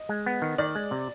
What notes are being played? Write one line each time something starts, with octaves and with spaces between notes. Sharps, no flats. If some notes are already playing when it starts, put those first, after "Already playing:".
Already playing: D#5
G#3
B3
D#3
D#3 D5
G#3
C3